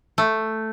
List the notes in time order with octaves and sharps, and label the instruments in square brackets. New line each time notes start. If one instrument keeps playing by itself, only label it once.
[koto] A3